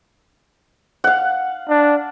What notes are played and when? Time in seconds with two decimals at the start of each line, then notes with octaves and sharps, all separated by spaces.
1.04 F5 F#5
1.69 D4